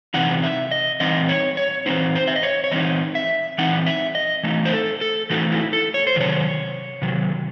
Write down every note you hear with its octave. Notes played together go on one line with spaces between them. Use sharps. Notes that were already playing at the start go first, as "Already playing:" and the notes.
C3 E3 C4 D#4 F#5
E5
D#5
E3 C4 D#4 D#5
C#5
C#5
E3 C4 D#4 C5
C5
E5
D#5
C#5
C#5
E3 C4 D#4 D#5
E5
E3 C4 D#4 F#5
E5
D#5
E3 A3 D#4
C5
A4
A4
E3 A3 D#4 F#4
E4
A4
C#5
C5
C3 D#3 F#3 C#5
C3 D#3 F#3